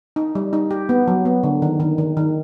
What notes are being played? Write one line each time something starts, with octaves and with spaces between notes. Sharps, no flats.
D#4
G3
D#4
G4
B3
F#3
B3
D3
D#3
D#3
D#3
D#3